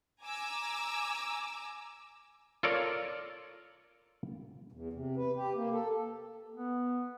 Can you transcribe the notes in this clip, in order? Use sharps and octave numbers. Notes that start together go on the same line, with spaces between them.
G#5 A#5 D6 E6
F4 A4 A#4 C#5 D5
E2
C3
B4
G4
A#3
A4
B3